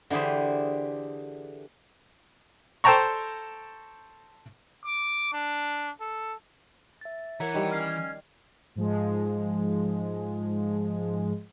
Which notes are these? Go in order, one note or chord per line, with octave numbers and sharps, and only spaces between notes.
D3 E3 G4 G#4 C5
A4 C5 G5 A5 A#5 C#6
D6
D4
A4
E5 A6
E3 A#4 C#5 E5 F#5 A#5
D#3 G3
C#4 F6 G#6 C7
G#2 F3 G#3